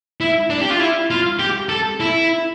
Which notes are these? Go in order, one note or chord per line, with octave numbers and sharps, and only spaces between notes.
E4
D4
G4
F4
E4
F4
G4
A4
E4